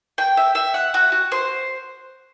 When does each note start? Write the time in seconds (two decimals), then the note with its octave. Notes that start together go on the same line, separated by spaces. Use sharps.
0.18 G5
0.37 E5
0.55 E5
0.74 F#5
0.94 F#4
1.12 F#4
1.32 C5